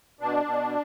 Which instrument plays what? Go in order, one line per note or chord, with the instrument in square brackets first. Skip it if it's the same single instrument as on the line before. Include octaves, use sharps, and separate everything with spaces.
[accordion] B2 D4
B2